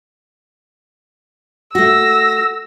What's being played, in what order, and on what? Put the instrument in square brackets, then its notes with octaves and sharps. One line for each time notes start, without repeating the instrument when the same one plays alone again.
[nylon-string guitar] A3 F#4 [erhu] E6 [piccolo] A#6